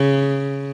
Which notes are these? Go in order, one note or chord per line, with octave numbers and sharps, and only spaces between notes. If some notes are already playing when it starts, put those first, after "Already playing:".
Already playing: C#3